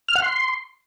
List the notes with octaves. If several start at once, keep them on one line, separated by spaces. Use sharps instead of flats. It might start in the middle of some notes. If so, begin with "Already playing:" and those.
F6
F#5
C6